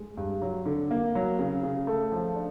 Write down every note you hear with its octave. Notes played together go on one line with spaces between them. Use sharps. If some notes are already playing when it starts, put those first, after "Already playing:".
Already playing: G#3
G2
F#3
D3
A#3
F#3
C#3
C#3
A3
F3
D4